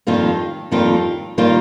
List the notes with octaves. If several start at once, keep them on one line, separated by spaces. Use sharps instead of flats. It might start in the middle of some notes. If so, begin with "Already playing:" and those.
F2 D#3 G3 A#3 F4
F2 D#3 G3 A#3 F4
D#3 G3 A#3 F4